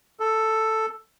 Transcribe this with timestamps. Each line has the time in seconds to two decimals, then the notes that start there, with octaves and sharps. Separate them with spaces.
0.20 A4